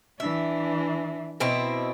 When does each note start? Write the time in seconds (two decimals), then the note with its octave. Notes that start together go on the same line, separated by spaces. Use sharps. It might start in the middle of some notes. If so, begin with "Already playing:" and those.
0.20 E3 D4 E5
1.40 B2 B3 C4 E4